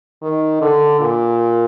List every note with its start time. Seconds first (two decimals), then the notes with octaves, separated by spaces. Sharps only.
0.22 D#3
0.61 D3
1.00 A#2